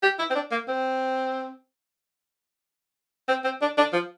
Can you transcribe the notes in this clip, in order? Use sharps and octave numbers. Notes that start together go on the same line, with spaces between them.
G4
E4
C4
D4
A#3
C4
C4
C4
D4
D4
F3